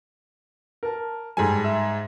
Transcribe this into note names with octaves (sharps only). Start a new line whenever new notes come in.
A#4 A5
G#2 G3 A4 G#5
E5